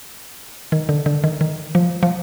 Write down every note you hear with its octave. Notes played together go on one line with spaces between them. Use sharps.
D#3
D3
D3
D#3
D#3
F3
F3